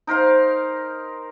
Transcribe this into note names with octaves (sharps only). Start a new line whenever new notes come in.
D#4 A#4 C5 F5